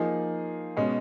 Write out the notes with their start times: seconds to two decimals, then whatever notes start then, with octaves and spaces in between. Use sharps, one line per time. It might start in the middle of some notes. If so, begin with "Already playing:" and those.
Already playing: F3 A#3 D#4 G#4
0.77 B2 G#3 C#4